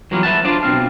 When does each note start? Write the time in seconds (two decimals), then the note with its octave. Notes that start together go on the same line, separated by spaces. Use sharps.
0.11 E3 F#3 G3 A#3 B3 F4
0.23 B4 E5 F#5 A5
0.45 D4 F4 C5 D5 A5
0.63 B2 E3 C4 F5